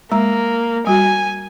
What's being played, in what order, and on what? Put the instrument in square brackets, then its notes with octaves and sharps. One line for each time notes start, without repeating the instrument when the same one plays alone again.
[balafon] G#3 A#5 [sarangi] A#3
[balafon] G3 F#4 [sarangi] G#5